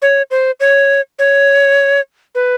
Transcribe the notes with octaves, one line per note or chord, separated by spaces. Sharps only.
C#5
C5
C#5
C#5
B4